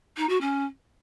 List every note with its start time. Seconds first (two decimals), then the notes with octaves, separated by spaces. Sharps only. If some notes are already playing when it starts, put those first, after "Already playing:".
0.17 D#4
0.29 F#4
0.41 C#4